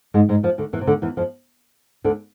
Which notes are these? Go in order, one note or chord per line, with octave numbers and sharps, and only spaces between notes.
G#2 G#3
G#2 G#3
F2 F3
D2 D3
E2 E3
C3
D2 D3
E2 E3
F2 F3
D2 D3